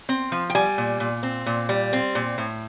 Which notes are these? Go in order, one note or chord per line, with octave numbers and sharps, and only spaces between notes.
C4
F3
G5
G3 G#5
A#2
A#2
C4
A#2
G3
C4
A#2
A2